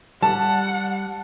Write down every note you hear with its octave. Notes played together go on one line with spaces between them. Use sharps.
G3 F#5 A5